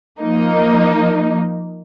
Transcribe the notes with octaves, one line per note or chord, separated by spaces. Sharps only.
F3 A#3 D#4